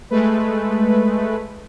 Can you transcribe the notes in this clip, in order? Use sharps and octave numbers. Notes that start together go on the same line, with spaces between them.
G#3 A3 B4